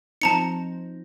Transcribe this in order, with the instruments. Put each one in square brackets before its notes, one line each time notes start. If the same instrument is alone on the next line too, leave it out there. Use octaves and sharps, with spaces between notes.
[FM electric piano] F3 C4 D#4 [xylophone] A5 A#5 C#7